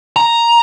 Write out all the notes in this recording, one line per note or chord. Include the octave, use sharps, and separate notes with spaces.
A#5